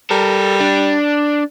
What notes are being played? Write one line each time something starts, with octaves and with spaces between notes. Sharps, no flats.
G3 A4 A#4
D4